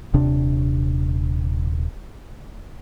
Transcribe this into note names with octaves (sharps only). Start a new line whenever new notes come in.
D#1 C3 D4